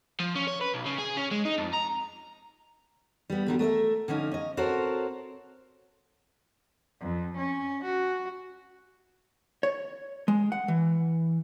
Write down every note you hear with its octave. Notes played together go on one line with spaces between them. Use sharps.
F3
C#4
C#5
B4
B1
C#3
G#4
C#4
G#3
D#4
F2
A#5
G3 B3
D3 F#3 G3
A3 A#4 D#5 E5
D3 F3 C#4 D#4
C#4 D#5
C4 F#4 A4 A#4 C5 C#5
F2
C#4
F#4
C#5
G#3
F#5
E3